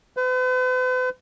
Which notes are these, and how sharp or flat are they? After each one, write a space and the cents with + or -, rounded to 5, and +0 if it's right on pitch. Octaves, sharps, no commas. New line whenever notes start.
B4 +45